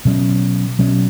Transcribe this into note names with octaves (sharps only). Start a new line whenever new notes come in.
B2 F#3 C#4
B2 F#3 C#4